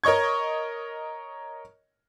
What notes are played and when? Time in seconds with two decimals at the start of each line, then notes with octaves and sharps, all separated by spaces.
0.04 A#4 C#5 D#5 C#6 G#6